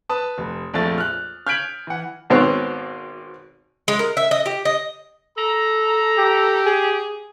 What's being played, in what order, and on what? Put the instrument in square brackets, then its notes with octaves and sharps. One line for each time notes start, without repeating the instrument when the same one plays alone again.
[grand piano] B4 A5 D#6
F1
A#1 F2 A3 A6
F6 F#6
F6 G6 G#6 B6 D7 F#7
E3 F#5
[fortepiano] G#1 B2 C4 C#5
[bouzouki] G#3
A#4
E5
D#5
G4
D#5
[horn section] A4 A#5
[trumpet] G4
[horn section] G#4